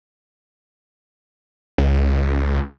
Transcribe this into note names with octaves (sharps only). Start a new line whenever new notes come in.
C#2